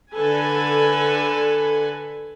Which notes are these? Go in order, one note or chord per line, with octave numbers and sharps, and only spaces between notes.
D3 A4 B4 G#5